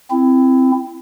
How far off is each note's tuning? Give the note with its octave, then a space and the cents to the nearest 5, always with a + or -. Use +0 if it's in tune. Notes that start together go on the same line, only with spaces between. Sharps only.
C4 +0 E4 +20